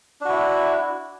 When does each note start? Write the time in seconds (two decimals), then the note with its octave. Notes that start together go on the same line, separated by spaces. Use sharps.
0.21 D4
0.25 F#4
0.29 E4